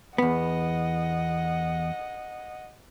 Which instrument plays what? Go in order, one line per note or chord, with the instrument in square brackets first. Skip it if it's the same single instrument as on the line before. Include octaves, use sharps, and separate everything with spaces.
[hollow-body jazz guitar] E2 B3 [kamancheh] D#5 F#5